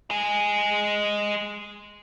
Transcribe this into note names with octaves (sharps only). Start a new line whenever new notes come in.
G#3 G#4